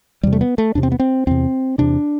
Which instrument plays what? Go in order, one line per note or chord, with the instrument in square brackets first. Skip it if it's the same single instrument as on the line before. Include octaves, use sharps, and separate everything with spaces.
[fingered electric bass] E2 C3 G3
A3
B3
A3
E2 C3 D4
C4
B3
C4
E2 C3 C4
E2 C3 D4